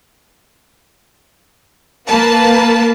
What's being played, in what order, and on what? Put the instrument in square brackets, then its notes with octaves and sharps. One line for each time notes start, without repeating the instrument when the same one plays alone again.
[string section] A#3 A#4 B4 A5